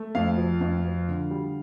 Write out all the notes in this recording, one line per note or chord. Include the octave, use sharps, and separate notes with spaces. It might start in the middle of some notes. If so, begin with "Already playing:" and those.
Already playing: A3
F2 F5
F3
F2
F3
D3
G3